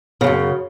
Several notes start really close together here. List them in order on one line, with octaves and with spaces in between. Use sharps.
C#3 A#2 F#2